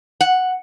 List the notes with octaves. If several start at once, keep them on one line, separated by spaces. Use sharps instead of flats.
F#5